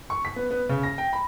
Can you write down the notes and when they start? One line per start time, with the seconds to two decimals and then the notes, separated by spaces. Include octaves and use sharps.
0.10 C#6
0.25 B6
0.36 B3
0.51 B3
0.69 C#3
0.84 A#6
0.98 G5
1.13 B5